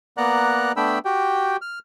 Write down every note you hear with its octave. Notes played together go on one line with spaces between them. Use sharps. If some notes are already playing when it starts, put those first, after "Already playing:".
A#3 B3 D5 F#5 A#5 F#6
A3 B3 D4 G5 B5 E6
F#4 G4 G5
F6